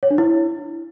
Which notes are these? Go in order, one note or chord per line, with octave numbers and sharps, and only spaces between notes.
C#5
D4
E4